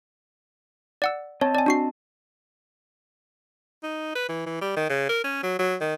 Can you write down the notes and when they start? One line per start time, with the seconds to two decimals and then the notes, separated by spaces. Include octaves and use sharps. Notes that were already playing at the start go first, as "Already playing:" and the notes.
1.02 D5 F#5 E6
1.41 C4 C#5 D#5 A5
1.55 D5 G#5
1.66 D4 F#4 C7
3.83 D#4
4.15 B4
4.29 E3
4.46 E3
4.61 G3
4.77 D#3
4.90 C#3
5.09 A#4
5.24 C#4
5.43 F#3
5.59 F#3
5.81 D#3